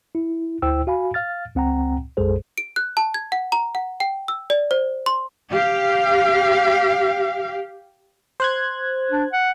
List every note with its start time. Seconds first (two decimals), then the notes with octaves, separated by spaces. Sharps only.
0.15 E4
0.62 D2 E4 C5 G5 E6
0.87 F#4 F5 G#5 B5
1.14 F5 F6 A6
1.55 C#2 C4 F#5 G5 A#5
2.17 B1 F#2 G#3 G#4 A4 C5
2.58 D7
2.76 F#6
2.97 A5
3.14 G#6
3.32 F#5
3.52 A#5
3.75 F#5
4.00 G5
4.28 E6
4.50 D5
4.71 C5
5.06 C6
5.49 G4 F5
8.40 C5 F#6 G#6
9.11 D4
9.33 F#5